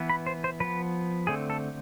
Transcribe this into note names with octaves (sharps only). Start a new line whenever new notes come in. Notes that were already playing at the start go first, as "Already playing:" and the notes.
Already playing: E3 B3
B5
C5
C5
F3 B3 B4
D3 A3 C4 G#4
A4